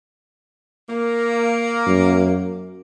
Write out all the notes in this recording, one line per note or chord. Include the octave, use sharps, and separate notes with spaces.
A#3
F#2